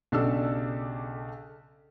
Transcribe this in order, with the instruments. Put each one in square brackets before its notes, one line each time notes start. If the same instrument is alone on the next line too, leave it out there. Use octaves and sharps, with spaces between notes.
[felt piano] B1 C#3 D4 G4 A4 E6